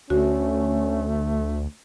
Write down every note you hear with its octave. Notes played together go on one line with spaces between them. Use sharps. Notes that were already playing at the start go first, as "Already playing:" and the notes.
D2 A3 C#4 F#4